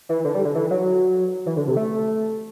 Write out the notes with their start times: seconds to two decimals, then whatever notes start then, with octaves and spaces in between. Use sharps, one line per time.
0.09 E3
0.25 D3
0.35 G3
0.45 D3
0.55 E3
0.70 F#3
1.46 E3
1.57 D3
1.67 C3
1.77 A3